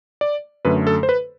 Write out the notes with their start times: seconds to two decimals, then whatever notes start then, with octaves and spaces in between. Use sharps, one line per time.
0.21 D5
0.65 F#2 D3 A3 B4
0.87 A4
1.03 C5
1.09 B4